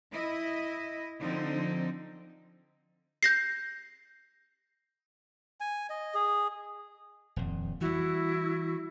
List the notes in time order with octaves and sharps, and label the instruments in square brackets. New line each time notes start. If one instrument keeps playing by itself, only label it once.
[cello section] E4 D#5
D3 F3 C4 D#4
[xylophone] G6 A#6 C7
[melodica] G#5
D#5
G#4
[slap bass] D#1 F2
[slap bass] E3 G3 [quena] E4 [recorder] F#4